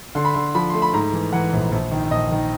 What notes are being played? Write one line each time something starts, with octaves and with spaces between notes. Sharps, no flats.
D3 C6
B5
D3 C6
F3 B5
A3 C6
B5
G#2 A#5
E3
E3 F#5
A#1
A#1
D#3
A#1 D#5
D#3